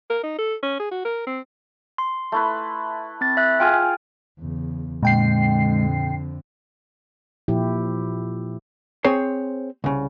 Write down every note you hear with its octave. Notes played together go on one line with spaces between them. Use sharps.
A#4
D#4
A4
C#4
G#4
F#4
A#4
C4
C6
A3 E4 B4
C4 A6
E5 F#6
F4 G#4 G5 G#5 F6
E2 C#3
F2 A#2 D3 G#3 G5 C7
A#2 F3 E4 G4
C4 G#4 C5 C#5 C6
C2 C#3